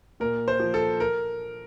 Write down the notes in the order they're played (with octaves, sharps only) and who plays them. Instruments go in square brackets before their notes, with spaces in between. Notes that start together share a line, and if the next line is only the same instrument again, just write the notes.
[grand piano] A#2 A#4
C5
F3
A4
A#4